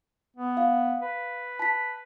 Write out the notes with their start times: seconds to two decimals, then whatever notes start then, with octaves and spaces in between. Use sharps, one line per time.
0.37 B3
0.57 F5
1.02 B4
1.59 A5 B6